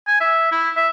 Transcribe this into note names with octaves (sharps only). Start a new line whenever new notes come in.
G#5
E5
E4
E5